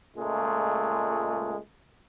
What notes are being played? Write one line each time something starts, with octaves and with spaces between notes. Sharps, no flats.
C#2 A#2 G#3 A3